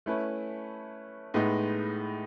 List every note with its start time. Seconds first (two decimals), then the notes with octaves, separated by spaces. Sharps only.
0.06 A3 C#4 E4 B4
1.34 A2 G#3 B3 D#4